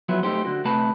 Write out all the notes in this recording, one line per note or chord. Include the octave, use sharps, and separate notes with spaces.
F3 F#3 B3 E4
A3 D#4 G4 C5
D3 F#4
C3 A3 B4 A5 B5